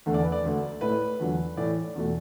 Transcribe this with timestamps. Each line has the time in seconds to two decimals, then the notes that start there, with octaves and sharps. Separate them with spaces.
0.06 E2 D3 A3
0.14 D5
0.23 B4
0.32 D5
0.43 D2 D3 A3
0.81 A2 A3 B4
1.20 E2 D3 F#3
1.57 A2 E3 A3 D5
1.95 E2 B2 A3